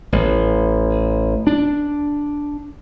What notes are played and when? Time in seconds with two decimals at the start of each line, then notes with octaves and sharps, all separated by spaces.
0.12 A1
1.47 D4